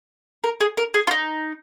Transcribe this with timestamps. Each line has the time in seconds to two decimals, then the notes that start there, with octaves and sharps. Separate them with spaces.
0.44 A#4
0.60 G#4
0.77 A#4
0.94 G#4
1.07 F4
1.11 D#4